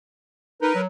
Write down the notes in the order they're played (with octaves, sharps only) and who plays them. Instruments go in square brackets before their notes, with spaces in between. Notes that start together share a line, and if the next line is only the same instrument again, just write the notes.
[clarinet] D#4 [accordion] A#4 B4
[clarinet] F#3